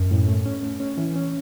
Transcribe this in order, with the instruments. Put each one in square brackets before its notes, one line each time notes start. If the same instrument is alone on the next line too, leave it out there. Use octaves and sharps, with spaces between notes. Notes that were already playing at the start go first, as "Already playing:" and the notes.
Already playing: [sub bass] F#2
[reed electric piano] A2
A3
C#4
A3
C#4
E3
C#4